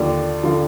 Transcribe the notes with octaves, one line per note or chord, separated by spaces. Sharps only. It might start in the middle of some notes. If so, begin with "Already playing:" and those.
Already playing: D#2 D3 F3 D5
D3 F3